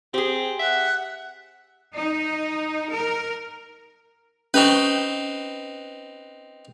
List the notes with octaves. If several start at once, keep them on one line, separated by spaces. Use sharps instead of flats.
C4 G4 G#4
E5 F#5
D#4
A#4
C4 C#4 D#4 B4 C#6